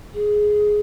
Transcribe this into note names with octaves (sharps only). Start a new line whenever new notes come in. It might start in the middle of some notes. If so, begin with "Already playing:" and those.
G#4